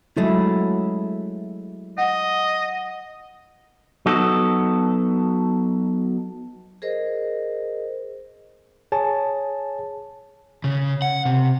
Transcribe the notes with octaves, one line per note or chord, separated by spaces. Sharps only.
F#3 G#3 A3 C#4 E4
D#5 F#5
F#3 B3 D#4 F#4 A4
G#4 A#4 C5 D#5
G#4 C#5 G#5 A5
C#3
F#5
C3